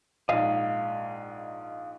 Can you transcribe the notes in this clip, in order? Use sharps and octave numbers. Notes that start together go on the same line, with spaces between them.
A#1 G#2 D#5 F5